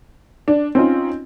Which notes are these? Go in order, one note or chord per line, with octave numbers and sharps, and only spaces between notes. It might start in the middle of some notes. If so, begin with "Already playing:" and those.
D4
C4 C#4 D#4 F4